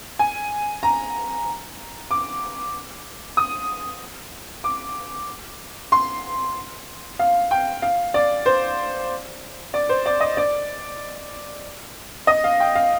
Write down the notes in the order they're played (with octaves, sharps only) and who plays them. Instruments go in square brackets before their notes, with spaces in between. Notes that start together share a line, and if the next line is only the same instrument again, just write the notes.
[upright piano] G#5
A#5
D6
D#6
D6
C6
F5
G5
F5
D5
C5
D5
C5
D5
D#5
D5
D#5
F5
G5
F5